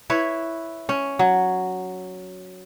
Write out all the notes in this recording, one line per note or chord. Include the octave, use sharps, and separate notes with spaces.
E4 B4 C#5
C#4
F#3